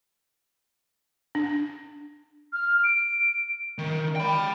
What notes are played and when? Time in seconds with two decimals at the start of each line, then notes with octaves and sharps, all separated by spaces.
1.35 D4
2.53 F6
2.84 D7
3.78 D#3
4.16 G5 B5